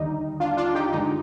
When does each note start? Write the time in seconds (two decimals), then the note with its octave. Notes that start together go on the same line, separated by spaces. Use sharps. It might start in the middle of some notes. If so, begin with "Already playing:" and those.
Already playing: D#2 D3 G3 D#4
0.40 D4 F4
0.57 D4 F4
0.75 D#4 G4
0.92 G2 D3 G#3 D#4